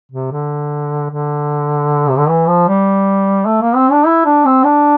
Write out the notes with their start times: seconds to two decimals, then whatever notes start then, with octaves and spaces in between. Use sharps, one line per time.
0.12 C3
0.32 D3
1.10 D3
2.09 C3
2.18 D3
2.29 E3
2.47 F3
2.68 G3
3.46 A3
3.61 A#3
3.76 C4
3.91 D4
4.06 E4
4.25 D4
4.45 C4
4.64 D4